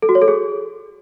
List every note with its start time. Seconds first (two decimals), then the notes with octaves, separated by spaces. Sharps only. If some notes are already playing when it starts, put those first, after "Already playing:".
0.02 A4
0.09 F#4
0.15 C#5
0.22 A4
0.28 G#4